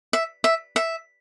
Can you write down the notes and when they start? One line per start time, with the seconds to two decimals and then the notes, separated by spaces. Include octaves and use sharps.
0.13 E5
0.44 E5
0.76 E5